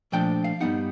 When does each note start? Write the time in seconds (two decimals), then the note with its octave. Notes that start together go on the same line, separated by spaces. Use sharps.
0.12 A#2 F3 A3 D4 G5
0.44 F5
0.61 G2 E3 G3 B3 D#4 F#5